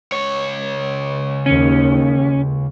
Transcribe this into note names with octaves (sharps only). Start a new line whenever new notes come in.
C#2 C#5
D#2 D#3 C#4